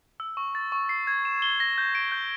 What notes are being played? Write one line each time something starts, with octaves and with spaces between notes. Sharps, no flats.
E6
C#6
A6
C#6
C7
G#6
E7
G7
A#6
G6
D7
G6